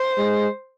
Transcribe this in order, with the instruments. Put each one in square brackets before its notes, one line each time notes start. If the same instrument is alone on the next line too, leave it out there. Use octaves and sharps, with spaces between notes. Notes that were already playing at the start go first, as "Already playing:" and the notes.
Already playing: [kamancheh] C5
[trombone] G#3